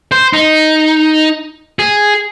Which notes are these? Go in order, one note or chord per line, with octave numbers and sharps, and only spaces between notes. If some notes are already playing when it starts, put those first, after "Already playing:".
C5
D#4
G#4